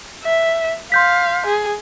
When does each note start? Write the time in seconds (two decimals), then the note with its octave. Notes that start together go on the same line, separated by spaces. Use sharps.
0.23 E5
0.92 F5 C6 G6 B6
1.46 G#4